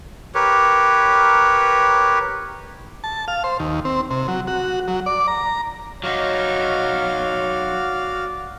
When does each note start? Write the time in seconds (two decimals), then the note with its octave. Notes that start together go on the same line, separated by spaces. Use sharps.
0.35 G4 A#4 B4 C#5
3.04 A5
3.28 F5
3.44 C5
3.60 D#2
3.85 C4
4.11 C3
4.28 F#3
4.47 F#4
4.88 F#3
5.06 D5
5.28 A#5
6.04 F#3 D#4 F#4 C#5 D5 F5 F6